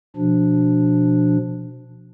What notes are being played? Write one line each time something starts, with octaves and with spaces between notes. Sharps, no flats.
B2 F3 D4